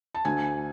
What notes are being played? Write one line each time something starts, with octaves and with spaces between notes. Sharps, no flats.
A5
D2 G#5